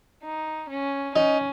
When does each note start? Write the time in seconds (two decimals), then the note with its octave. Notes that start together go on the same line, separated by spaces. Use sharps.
0.23 D#4
0.69 C#4
1.15 C#4 D#4